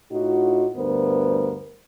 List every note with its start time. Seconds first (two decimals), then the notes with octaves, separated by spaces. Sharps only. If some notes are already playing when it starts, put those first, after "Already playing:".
0.12 A2 D#4 F4 F#4
0.76 D2 G2 B3 A#4 C5